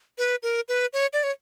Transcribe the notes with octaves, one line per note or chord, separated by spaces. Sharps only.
B4
A#4
B4
C#5
D5
C#5